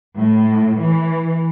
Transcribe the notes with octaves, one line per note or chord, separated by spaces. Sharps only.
A2
E3